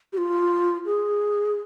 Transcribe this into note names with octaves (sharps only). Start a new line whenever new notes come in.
G4
F4
G#4